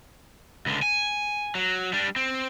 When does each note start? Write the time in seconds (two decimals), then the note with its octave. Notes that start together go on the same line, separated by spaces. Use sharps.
0.66 C#2 D3
0.82 G#5
1.55 F#3
1.93 G3 D4
2.16 C4